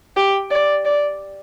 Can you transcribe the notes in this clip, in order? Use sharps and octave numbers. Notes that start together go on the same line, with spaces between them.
G4
D5
D5